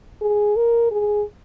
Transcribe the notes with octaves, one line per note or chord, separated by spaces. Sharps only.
G#4
A#4
G#4